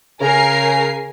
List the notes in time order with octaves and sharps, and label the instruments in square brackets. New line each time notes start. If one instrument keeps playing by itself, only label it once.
[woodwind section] C#3 [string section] A#4 [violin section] G#5 C7